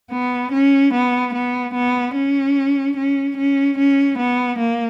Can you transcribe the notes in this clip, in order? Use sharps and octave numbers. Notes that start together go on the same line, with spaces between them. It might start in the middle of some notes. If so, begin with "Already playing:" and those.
B3
C#4
B3
B3
B3
C#4
C#4
C#4
C#4
B3
A#3